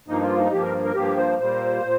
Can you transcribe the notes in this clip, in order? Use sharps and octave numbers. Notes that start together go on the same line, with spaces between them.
G2 F3 A#3 D#4
F4
D#4
G2 F3 A#3 G4
A#4
A#4
G2 F3 A#3 G4
C5
A#2 G3 A#3 C5
A#2